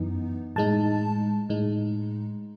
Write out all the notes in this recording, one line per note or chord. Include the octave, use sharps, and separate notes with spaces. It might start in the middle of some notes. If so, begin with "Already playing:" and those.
Already playing: F#2 E3 B3 D#4
A2 G#3 D#4 A5
A2 G#3 D#4